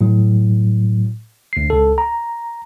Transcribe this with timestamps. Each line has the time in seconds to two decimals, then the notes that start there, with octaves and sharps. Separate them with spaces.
0.01 A2 F#3
1.53 D2 C7
1.70 C#2 A4
1.98 A#5